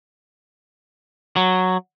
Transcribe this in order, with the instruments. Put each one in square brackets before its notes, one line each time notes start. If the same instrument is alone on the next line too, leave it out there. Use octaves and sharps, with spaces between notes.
[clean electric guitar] F#3